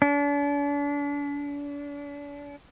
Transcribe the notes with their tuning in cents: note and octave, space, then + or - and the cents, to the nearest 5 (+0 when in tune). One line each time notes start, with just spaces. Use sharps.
D4 -40